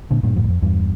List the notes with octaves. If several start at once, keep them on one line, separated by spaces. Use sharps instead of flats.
A#2 D3
G2 A#2
F2 A2
E2
F2
E2 G2